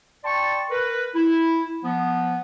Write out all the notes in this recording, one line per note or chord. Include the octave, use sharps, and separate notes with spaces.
D5 G5 A5 C6 C#6
A#4 B4
E4
F3 B3